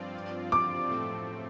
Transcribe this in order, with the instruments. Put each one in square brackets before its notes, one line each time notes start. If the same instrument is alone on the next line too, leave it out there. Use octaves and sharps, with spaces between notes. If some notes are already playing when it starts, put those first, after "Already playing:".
Already playing: [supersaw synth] G2 F3 C4 F4 D5
[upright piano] D6
[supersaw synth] A2 F3 A3 C4 A4